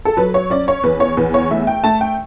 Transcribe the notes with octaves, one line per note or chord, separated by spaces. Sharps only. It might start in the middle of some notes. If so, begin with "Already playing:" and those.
A4
F#3 B4
C#5
C#4 D5
C#5
E2 B4
C#5
E2 B4
C#5
A3 E5
G5
A3 A5
G5